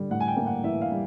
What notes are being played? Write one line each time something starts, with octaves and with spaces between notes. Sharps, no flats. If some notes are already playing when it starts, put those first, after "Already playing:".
Already playing: D3 G3
A2 F#5
G#5
G5
A#3
F#5
E3 E5
F5
G3